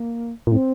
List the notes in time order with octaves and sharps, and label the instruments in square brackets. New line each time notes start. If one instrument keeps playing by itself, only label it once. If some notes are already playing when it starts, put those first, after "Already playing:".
Already playing: [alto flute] A#3
[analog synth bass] A#2
[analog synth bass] A2 [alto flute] C4